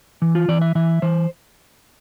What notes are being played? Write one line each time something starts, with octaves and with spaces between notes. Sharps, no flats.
E3
F4
E3 D5
E5
E3 E5
E3 C5